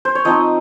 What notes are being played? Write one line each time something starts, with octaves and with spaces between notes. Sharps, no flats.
C5
C#5
F3 C4 D#4 D#5